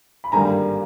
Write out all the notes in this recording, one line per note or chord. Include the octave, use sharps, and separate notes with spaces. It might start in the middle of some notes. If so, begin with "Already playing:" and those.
B5
G#1 G2 D3 G3 A#3 G#5 A#5